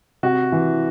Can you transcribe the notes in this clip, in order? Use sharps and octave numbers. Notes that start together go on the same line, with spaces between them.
C3 F#4
E3